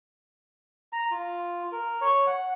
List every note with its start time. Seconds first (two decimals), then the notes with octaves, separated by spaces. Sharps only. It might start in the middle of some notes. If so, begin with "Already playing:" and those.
0.93 A#5
1.11 F4
1.72 A#4
2.01 C#5
2.27 F#5